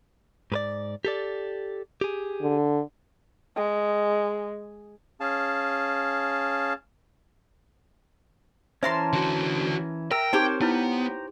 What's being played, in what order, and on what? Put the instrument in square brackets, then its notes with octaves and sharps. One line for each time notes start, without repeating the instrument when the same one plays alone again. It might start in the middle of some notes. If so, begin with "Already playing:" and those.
[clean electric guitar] G#2 B4 D5
G4 A4 D5
G4 G#4
[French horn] D3
[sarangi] G#3
[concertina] C#4 G#4 F5 A5
[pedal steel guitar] E3 C#4 [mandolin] A#4 A5 C6 [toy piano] C5 E5
[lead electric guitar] D3 F#4
[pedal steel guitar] A#4 A#5 [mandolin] E5 [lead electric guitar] G5
[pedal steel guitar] C4 A#4 D6 [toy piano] D#4 [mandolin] G4 C5 C#5
[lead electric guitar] B3 [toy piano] D#4 E4 B4 [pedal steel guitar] G5 A#5